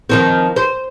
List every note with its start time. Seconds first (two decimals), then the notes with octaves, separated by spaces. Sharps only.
0.10 D#3 F3 C4
0.56 C5